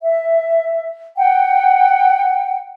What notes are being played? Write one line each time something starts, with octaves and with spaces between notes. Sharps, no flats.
E5
F#5 G5